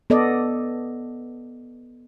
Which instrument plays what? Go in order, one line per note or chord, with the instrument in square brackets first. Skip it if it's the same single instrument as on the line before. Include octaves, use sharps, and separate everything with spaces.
[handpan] B3 A4 D5 D#5